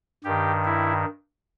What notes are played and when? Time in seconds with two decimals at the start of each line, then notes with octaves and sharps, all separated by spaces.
0.24 G2 D#3 G4
0.65 E4